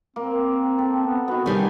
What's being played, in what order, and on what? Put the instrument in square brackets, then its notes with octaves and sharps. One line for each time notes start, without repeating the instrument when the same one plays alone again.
[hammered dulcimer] A#3 [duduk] C4
[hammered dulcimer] A4
[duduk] B3
[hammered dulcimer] B3 D#4 [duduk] F#4
[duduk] C3 [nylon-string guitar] D#3 G3 G#4